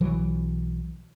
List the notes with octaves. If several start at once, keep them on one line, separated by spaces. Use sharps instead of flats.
B1 E3 F#3